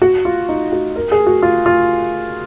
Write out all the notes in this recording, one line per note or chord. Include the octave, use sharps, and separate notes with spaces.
F#4
F4
D#4
F#4
A#4
G#4
F#4
F4
F4